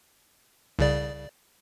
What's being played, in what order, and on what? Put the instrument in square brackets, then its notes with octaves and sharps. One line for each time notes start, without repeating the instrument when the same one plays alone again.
[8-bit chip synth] C2 C#3 D5